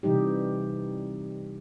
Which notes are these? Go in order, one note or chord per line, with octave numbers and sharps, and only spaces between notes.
C3 E3 G3 D#4 G4